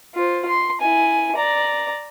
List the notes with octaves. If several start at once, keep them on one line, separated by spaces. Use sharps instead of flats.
F4 C5
C6
E4 G#5
D5 A#5